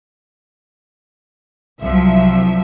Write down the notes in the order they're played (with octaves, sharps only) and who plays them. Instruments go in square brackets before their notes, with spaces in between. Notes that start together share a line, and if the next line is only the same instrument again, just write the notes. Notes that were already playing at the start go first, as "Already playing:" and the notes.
[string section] C2 F3 F#3 E5